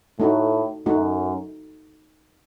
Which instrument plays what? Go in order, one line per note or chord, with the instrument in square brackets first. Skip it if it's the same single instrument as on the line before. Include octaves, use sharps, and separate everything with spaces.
[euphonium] A2 [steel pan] A3 D#4 F#4
[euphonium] F#2 [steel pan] A3 D#4 F#4